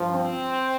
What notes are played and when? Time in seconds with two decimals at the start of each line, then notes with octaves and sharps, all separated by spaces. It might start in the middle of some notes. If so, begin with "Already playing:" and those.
Already playing: G2 F3
0.12 C4